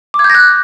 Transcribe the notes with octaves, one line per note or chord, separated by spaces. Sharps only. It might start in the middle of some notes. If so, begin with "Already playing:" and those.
D6
G#6
G6
A#6
F#6